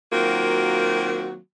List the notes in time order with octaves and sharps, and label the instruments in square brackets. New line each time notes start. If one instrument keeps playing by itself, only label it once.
[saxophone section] D#3 F#3 A#3 C4 F4 F#4